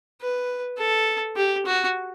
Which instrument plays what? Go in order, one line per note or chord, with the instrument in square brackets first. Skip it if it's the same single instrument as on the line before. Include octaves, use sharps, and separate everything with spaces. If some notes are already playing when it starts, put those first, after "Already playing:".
[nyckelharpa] B4
A4
G4
F#4